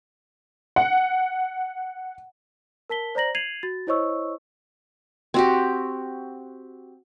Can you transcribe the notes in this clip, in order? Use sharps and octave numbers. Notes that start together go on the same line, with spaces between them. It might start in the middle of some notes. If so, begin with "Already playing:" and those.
F#5
A#4 A5 B6 G7
C5 D5 A#5 A#6 F#7
G#6 C7 D#7 F7 F#7
F#4 A6
E4 C5 C#5 D#5 C#6 E6
C4 F#4 G4